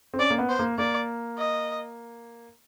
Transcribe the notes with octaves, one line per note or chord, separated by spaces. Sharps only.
C4
C#4 D5
A#3
B3
C5
A#3
A#3 D5
D#5